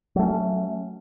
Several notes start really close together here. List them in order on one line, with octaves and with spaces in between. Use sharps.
F#3 A3 C#4